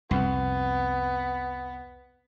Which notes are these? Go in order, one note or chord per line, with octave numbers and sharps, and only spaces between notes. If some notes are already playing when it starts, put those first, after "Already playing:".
C2 F2 B3